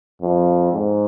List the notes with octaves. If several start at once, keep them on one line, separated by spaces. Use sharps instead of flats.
F2
G#2